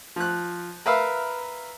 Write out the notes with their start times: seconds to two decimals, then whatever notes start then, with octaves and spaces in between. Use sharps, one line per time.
0.16 F3 F#6
0.86 A#4 B4 E5 F5